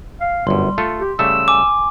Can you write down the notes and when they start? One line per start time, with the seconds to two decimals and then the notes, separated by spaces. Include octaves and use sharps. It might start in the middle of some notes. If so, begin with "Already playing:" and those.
0.21 F5
0.47 G1 F#2 G3 C6
0.78 A3 F4 A4
1.00 G4
1.19 C#3 G3 A3 E6
1.48 G#5 D6